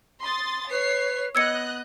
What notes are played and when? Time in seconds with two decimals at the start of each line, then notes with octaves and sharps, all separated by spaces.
0.22 C6 D#6 A6
0.71 B4 C#5 C7
1.35 B3 D#5 E6 F#6 G#6 C#7